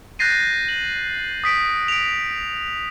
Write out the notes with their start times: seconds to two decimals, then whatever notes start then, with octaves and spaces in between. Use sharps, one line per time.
0.19 F#6 G6 A6 A#6 C7 D#7
0.68 F#7
1.44 D#6 B6 D7
1.88 D7 F7